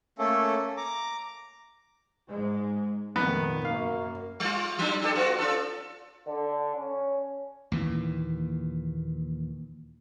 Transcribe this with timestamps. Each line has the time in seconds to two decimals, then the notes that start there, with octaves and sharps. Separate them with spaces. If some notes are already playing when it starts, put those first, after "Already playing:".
0.19 A3 A#3 C#4 A4
0.77 A#5 D6
2.28 G#2 G#3
3.16 F1 A#2 D#3 B3
3.65 F#2 A#3 F5
4.40 G3 F4
4.79 F#3 G3 D4
5.01 D4 G4 A4
5.15 B3 F4 F#4
5.38 C#4 F4 A4
6.27 D3
6.76 C#4
7.72 D#2 A#2 E3